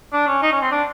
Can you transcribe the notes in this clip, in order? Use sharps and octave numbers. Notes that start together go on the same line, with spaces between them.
D4
C#4
D#4
C#4
C4
D4